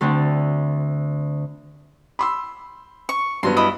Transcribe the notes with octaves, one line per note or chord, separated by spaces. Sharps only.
D2 D3 C4 D4
B5 C6 E6
C#6
G2 F#3 B3 C6
E4 D#5 B5